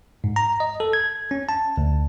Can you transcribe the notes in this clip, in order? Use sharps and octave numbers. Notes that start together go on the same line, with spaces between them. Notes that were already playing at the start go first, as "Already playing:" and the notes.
G#2
A#5
D#5
A4
G#6
C#4
A5
D2